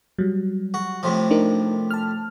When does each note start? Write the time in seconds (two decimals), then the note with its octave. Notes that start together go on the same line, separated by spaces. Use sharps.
0.19 F#3 G3
0.74 F#4
1.03 A2 C3 F3
1.30 D4 D#4 A#4
1.91 A5 F6